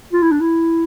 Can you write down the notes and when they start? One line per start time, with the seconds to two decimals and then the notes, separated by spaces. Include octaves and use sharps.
0.13 F4
0.22 E4
0.31 D4
0.40 E4